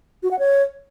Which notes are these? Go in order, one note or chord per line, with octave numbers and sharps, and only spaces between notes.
F#4
F#5
C#5